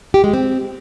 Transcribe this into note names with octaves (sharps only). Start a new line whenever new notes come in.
G4
G#3
C4